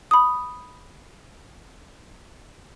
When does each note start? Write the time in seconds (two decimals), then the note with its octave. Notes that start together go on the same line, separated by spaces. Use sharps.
0.11 B5 D#6